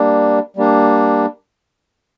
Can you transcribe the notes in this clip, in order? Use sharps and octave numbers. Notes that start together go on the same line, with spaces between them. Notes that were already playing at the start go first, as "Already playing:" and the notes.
Already playing: G3 A#3 D4
G3 A#3 D4